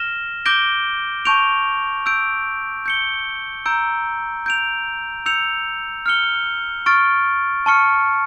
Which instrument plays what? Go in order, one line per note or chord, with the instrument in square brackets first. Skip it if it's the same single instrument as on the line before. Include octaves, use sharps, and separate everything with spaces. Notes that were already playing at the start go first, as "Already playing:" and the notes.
Already playing: [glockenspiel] F6 A#6 E7 G7
D6 G6 A#6 D7 G7
A5 C#6 G6 D7 F7
E6 G6 D7
G6 C#7 G7
A#5 E6 G6 D7
G6 D7 F7
E6 G6 C#7 F7
F6 C#7 G7
C#6 F6 A6 D7
A5 C#6 F6 C#7